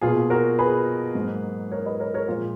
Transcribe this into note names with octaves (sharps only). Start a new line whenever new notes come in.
B2 A#3 F4 G#4
F#4 A#4
G#4 B4
G#2 F#3 A#3
A#4 C#5
B4 D#5
A#4 C#5
A#4 C#5
A#2 F3 G#3 F4